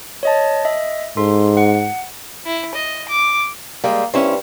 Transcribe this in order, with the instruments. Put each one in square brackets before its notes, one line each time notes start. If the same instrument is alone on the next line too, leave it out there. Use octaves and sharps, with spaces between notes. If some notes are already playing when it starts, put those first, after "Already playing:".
[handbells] C#5 D#5 A5
D#5 E5
[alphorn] G#2 [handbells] A4 C6
[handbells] F#5
[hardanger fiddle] E4
D#5
D6
[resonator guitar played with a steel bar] G3 G#3 [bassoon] A#3
[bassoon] G2 [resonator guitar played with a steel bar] C#4 E4 C5